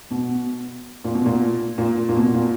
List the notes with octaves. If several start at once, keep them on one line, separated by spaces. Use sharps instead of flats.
B2
A#2
B2
A#2
A#2
A#2
B2
A#2